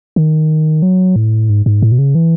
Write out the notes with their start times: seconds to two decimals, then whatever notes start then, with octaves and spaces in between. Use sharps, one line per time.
0.16 D#3
0.82 F#3
1.16 A2
1.50 G#2
1.66 G#2
1.82 A2
1.92 B2
1.98 C#3
2.15 E3